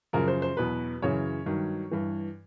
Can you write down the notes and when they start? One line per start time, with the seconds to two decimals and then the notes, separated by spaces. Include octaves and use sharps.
0.13 F#2 C#3 F3 A#4
0.28 C5
0.42 C5
0.57 E2 B2 F#3 B4
1.02 F#2 C#3 E3 C#5
1.46 G2 D#3 F#3
1.91 G2 E3